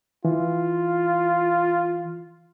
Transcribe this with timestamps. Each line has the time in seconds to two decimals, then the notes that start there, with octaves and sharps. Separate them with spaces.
0.25 E3 F4